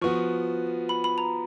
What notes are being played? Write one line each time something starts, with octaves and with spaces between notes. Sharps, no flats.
F3 B3 F#4 C#6
B5
B5
A#5